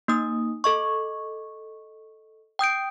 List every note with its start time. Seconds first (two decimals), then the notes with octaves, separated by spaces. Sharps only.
0.08 A#3 D#4 D#6
0.64 A4 D#5 C#6
2.59 G5 D#6 G6 D7